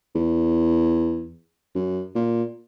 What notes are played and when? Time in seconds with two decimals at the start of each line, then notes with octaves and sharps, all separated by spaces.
0.15 E2
1.75 F#2
2.15 A#2